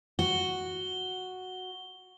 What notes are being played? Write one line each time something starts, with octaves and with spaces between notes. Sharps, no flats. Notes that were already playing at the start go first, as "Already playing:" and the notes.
F#4 G7